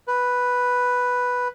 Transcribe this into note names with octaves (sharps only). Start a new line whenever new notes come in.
B4